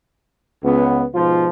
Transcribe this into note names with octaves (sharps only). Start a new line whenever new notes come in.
C#2 B3
G#2 B2 F3 F4